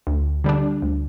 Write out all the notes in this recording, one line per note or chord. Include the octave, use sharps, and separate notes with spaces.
D2
D3 G3 D4
D2